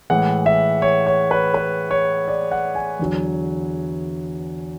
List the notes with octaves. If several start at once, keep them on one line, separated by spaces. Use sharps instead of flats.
A2 E3 G#3 F#5
E5
C#5
C#5
B4
B4
C#5
D5
F#5
G#5
E2 D3 F#3